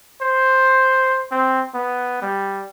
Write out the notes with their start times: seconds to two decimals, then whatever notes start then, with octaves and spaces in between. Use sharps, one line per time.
0.21 C5
1.32 C4
1.74 B3
2.22 G3